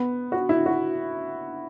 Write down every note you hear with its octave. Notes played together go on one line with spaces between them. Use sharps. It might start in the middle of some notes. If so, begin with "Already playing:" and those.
Already playing: B3
F#4
E4
F#4